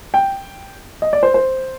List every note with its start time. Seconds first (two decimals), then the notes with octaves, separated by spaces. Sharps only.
0.14 G5
1.02 D#5
1.13 D5
1.23 C5
1.34 C5